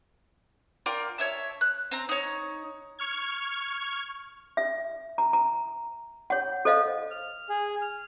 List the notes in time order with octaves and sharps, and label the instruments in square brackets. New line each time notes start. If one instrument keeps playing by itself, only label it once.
[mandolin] F4 A#4 D5 G5
C#5 E5 A5
F#6
C4 A#5
D#4 C#5
[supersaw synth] C#6 F6 G#6
[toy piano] E5
A#5
A#5
C#5 F#5
A4 C5 D#5 F5
[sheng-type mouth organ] F6
G#4
F6